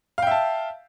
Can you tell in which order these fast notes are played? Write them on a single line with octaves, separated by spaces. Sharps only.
F5 G5 E5 A5